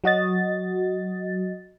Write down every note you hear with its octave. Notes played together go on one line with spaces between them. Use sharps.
F#3 F#4 D#5 A6